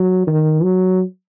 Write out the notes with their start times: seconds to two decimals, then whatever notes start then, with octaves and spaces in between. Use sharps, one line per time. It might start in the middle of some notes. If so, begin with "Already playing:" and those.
Already playing: F#3
0.27 D#3
0.63 F#3